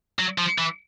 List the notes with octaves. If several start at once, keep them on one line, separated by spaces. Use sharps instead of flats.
F#3
F3
E3